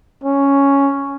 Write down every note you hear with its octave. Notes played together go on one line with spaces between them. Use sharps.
C#4